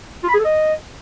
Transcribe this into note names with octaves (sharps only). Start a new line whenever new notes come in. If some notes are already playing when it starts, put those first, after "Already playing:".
F4
B5
G#4
A4
D#5